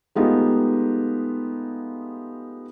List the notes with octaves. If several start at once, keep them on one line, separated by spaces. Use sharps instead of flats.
G#3 A3 B3 D#4 F4 G4